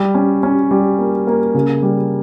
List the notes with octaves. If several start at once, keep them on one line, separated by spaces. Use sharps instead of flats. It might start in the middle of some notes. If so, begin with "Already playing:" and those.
Already playing: G3
C#4
C#4
G3
A#3
A#3
C#3
G3